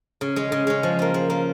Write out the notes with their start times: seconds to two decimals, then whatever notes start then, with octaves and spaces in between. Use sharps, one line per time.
0.21 C#3
0.36 G#3 C#4
0.52 C#3
0.67 G#3 C#4
0.83 F3
0.99 A#3 F4
1.14 F3
1.30 A#3 F4